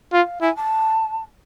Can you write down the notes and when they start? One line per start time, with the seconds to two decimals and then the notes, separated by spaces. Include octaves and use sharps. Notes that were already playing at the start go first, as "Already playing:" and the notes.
0.13 F4 F5
0.41 E4 G#5
0.56 A5